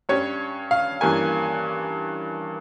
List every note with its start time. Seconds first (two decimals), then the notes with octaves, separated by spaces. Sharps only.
0.09 G2 G3 C#4 C#5
0.71 F5
1.01 G2 E3 A#3 C#4 G#5